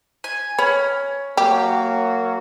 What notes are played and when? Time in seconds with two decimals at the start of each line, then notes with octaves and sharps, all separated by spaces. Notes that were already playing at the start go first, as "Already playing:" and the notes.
0.24 G#5
0.59 C#4 B4
1.37 F#3 A#3 F#4 G4